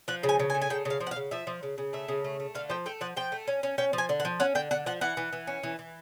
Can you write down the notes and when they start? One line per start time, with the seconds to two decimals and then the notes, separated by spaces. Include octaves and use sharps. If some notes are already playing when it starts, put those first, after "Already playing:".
0.08 F3 F#5
0.23 C#3
0.29 G#5
0.40 C#3
0.50 G#5
0.55 A3
0.62 G#5
0.70 C#3 G5
0.85 C#3 F5
1.01 F3
1.07 F#5
1.11 F5
1.16 C#3
1.31 F3 E5
1.47 F3
1.63 C#3
1.78 C#3
1.93 A3 E5
2.08 C#3
2.24 A3
2.40 A3
2.55 D3 F5
2.70 F3 G5
2.86 A3 G5
3.01 F3 F#5
3.17 F3 G5
3.32 A3
3.48 C#4
3.63 C#4
3.78 C#4 G5
3.93 F3
3.98 G#5
4.09 D3
4.20 F#5
4.25 F3
4.40 C#4 F#5
4.55 D3 G5
4.71 D3 F#5
4.86 F3 F#5
5.01 E3 F#5
5.17 E3
5.33 E3
5.47 C#4
5.63 E3
5.79 E3